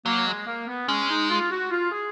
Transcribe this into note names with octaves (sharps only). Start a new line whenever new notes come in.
F#3 A#3
G#3
A#3
B3
G#3 C#4
D#4
F4
F#4
F4
G#4